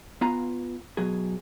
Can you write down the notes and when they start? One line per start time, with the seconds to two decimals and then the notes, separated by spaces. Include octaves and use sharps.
0.21 B3 F4 B4 F5 G#5 A#5
0.97 B2 F#3 G#4